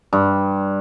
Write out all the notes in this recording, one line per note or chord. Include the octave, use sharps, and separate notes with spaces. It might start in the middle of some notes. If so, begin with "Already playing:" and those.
G2